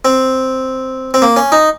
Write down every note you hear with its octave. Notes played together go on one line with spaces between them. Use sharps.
C4
C4
A#3
C#4
D#4